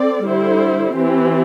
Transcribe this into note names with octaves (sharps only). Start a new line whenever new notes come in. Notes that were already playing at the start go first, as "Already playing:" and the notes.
Already playing: C4 A4 D5
D3 G3 E4 C5
E3 C4 G4